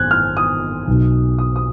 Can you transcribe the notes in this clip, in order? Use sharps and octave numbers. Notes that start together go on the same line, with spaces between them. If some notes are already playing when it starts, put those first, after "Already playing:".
Already playing: G#1 F#2 F#6 G#6
F6
D#6
B1 B2
D#6
D#6